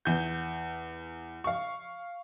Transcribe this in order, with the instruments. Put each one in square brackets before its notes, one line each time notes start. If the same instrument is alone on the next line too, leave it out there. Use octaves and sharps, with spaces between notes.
[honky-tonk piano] E2 G6
F5 C#6